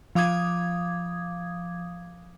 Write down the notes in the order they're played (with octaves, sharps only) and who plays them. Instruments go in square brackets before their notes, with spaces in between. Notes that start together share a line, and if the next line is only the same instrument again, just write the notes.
[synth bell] F3 F5 D6 D#6 G#6